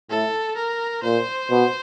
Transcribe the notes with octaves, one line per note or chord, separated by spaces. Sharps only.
A2 A4
A#4
A#2 C5
B2